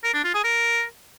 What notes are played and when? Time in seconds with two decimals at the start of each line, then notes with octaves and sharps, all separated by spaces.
0.04 A#4
0.14 D4
0.24 F4
0.34 G#4
0.44 A#4